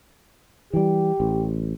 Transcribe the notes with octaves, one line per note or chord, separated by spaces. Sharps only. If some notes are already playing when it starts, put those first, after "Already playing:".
E3 G3 G4
A1